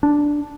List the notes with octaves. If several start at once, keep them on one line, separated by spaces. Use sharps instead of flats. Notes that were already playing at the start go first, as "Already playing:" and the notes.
D4